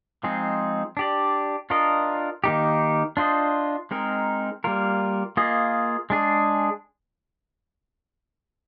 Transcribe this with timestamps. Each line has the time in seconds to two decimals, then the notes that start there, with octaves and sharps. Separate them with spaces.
0.23 F3 G#3 C4 D#4 G#4
0.97 D4 G4 D5
1.70 D4 F4 A#4 D#5
2.44 D#3 A#3 D#4 G4
3.17 D4 F4 C5 D#5
3.91 G#3 C4 D#4 A#4
4.64 G3 A#3 F4 A#4
5.37 A#3 F4 G#4 D#5
6.10 G#3 D4 G#4